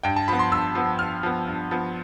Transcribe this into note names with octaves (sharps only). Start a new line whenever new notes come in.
G2 G5
A5
F3 B3 B5
C6
G2 E6
F3 B3
G2 F6
F3 B3
G2
F3 B3